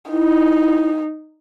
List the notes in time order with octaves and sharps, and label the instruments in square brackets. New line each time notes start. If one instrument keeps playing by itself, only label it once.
[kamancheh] D#4 [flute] E4